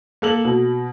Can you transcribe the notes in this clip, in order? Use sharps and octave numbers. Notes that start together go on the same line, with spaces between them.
A#3 A4 F#7
B2